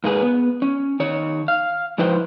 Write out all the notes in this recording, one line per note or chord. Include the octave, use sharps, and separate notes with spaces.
G#2 A#3 G#4 B4
B3
C#4
D#3 C#5
F5
G#2 F3 E4 B4 C5 G5